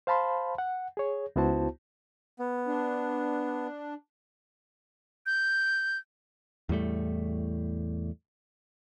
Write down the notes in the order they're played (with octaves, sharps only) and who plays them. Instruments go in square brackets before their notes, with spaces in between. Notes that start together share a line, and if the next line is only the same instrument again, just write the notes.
[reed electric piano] C5 F5 A5 B5 C6
F#5
G#4 C#5
C#2 B3 E4 F#4 C5 A5
[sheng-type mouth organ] B3
[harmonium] D4
[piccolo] G6
[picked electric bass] E2 A2 G3 A3